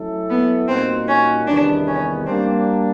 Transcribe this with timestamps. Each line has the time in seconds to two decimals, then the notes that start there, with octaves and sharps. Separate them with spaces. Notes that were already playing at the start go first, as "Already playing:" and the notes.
Already playing: F#3 A3 C#4 E4 A4
0.29 B3
0.68 A#2 G3 A#3 C4 D#4 F#4
1.08 C#4
1.47 E2 C3 D#3 G3 B3 D4
1.87 C#4
2.26 G3 A#3 C4 D4